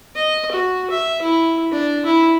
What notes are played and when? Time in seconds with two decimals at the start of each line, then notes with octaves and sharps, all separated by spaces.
0.15 D#5
0.51 F#4
0.90 E5
1.21 E4
1.72 D4
2.05 E4